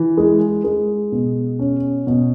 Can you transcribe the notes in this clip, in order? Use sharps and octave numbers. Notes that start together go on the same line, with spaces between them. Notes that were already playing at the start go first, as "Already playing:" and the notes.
Already playing: E3
G#3
G#3
B2
C#4
B2